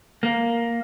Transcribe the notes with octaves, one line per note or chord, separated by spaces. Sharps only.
A#3